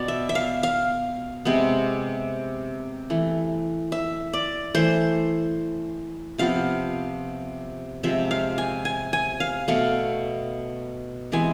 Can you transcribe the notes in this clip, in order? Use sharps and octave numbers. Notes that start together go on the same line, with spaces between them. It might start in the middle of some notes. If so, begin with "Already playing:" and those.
Already playing: B2 B3 D5
E5
E5
F5
F5
C3 G#3 B3
E3 A3
E5
D5
E3 A3 C5
C3 F3 B3 F5
C3 F3 G#3 E5
F5
G#5
G#5
G#5
F5
B2 A3 F5
C3 E3 G#3 B3 G#5